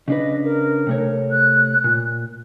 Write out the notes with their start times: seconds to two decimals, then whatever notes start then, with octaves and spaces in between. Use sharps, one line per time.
0.08 C#3 D4 B4 D#5
0.44 A#4
0.87 C3 A3 C#5
1.31 F#6
1.84 A#2